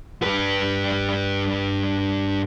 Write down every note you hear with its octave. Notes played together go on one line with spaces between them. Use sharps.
G2 B4